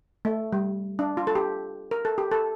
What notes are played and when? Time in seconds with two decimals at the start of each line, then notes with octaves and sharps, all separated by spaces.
0.25 A3
0.53 G3
0.99 D4
1.17 F4
1.27 A4
1.35 G4
1.91 A#4
2.05 A4
2.18 G4
2.31 A4